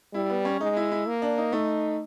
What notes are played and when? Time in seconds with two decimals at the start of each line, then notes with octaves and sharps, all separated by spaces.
0.14 G3 E4
0.30 B3
0.45 C#4
0.60 G#3 D#4
0.76 E4
0.91 E4
1.07 A#3
1.22 D4
1.38 D#4
1.52 A3 D#4